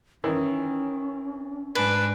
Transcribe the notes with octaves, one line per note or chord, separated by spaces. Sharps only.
D#3 E3 C#4
G#2 D4 B4 G#5